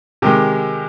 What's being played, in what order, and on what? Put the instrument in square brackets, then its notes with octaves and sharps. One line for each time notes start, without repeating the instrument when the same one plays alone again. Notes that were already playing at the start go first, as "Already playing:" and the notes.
[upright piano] C3 D#3 G#3 G4